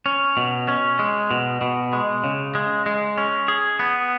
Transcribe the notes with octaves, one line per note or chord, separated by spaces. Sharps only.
C#4
B2
C#4
G#3
B2
B2
G#3
C#3
G#3
G#3
C#4
G#4
B3